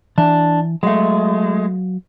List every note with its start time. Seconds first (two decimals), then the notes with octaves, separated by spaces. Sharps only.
0.18 E3 D4
0.83 F#3 G#3 A3 F5